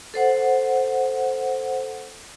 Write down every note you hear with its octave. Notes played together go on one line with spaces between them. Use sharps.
A4 C5 F#5